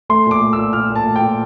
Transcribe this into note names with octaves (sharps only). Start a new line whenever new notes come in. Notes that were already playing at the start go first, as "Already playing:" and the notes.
A3 C6
A#2 D6
A3
A#2 E6
A#2 F6
A#2
A5
A3
G5
A#2